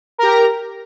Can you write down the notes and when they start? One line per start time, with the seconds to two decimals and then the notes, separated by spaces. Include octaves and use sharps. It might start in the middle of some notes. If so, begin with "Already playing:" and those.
0.18 A#4
0.23 G4
0.27 A#5